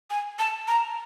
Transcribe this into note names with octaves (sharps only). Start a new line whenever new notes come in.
G#5
A5
A#5